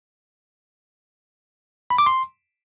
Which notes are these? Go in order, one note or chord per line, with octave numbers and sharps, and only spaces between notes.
B5
D6
C6